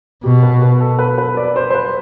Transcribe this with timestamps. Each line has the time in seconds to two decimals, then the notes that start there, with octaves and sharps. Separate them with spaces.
0.24 B2 G4
0.43 B4
0.62 B4
0.80 A4
0.99 B4
1.18 B4
1.37 D5
1.56 C5
1.70 C5
1.75 B4